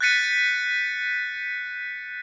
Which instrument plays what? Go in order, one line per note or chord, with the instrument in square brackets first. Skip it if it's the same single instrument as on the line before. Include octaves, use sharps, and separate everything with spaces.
[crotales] F#6 G6 A6 B6 C#7 D#7